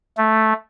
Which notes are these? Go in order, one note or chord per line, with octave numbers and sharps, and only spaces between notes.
A3